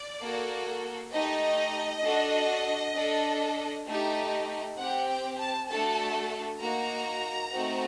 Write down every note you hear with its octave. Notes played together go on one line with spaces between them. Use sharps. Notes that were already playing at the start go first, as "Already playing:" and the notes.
Already playing: D5
A#3 F#4 A4
A3 D#4 G4 D#5
D4 F#4 A4
D4 A4
A3 D#4 G4
C4 G4 F#5
G5
A5
A3 D4 F#4 A4 A5
A#3 D#4 F#4 A#5
A3 C4 D#4 F#4